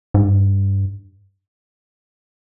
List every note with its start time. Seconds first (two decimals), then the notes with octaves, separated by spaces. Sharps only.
0.14 G#2
0.24 G2